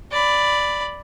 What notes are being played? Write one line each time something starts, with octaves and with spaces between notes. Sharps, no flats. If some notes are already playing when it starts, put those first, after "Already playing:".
D5 B5